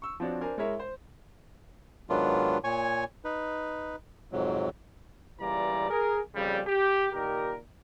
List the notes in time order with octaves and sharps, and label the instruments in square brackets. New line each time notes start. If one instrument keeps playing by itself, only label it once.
[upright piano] C#6 E6
F3 C4 D4 F#4 C#5
D4 A#4 C5 G#5
G#3 E4 A#4 C#5 E5
C5
[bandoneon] G#2 D#3 F#3 B3 D4 F4
A#2 C#5 G#5 C#6
D#4 B4
F2 G#2 C3 F#3
[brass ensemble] C#2 A#2 E3 G3 D5 A#5
G#4 A#4
F2 A#2 C#3 G3
G4
A#2 D#3 G4 A#4